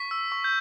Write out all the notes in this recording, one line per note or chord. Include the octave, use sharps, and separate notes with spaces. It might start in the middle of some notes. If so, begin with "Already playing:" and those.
Already playing: C#6 B6
E6
C#6
G6